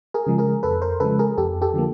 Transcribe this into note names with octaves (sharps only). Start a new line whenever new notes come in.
G#4 A#4
C#3 F3 G#3
G#4 A#4
F2 A4 B4
A#4 C5
C#3 F3 G#3 A4 B4
G#4 A#4
F2 G4 A4
G4 A4
D3 F3 A#3